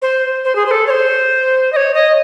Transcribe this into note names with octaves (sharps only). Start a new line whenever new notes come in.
C5
C5
G#4
C5
A4
C#5
C5
D#5
C#5
D#5